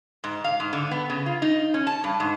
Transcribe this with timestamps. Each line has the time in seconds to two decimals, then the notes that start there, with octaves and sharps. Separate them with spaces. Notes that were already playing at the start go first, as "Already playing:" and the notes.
0.24 G#2
0.44 F5
0.60 G#2
0.73 D3
0.91 B3
1.10 C#3
1.26 F4
1.42 D#4
1.74 C#4
1.87 A5
2.04 G2
2.20 G#2